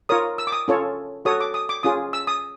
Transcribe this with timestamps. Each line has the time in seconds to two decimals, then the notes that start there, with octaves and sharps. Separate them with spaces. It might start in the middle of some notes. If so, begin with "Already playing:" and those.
0.09 F4 A#4 C#5 D#6
0.38 E6
0.47 D6
0.52 D#6
0.68 C#4 F4 A4 C#5
1.25 F#4 A4 C#5 D#6
1.41 D6
1.54 D#6
1.69 D6
1.83 C#4 F4 G#4 D#6
2.13 E6
2.27 D#6